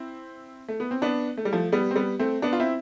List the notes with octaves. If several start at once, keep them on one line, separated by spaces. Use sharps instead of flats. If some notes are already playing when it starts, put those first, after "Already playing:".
Already playing: C4 E4
A3
B3
C4
B3 D4
A3
G3
F3 A3
G3 B3
C4
G3 B3
A3 C4
B3 D4
F4
C4 E4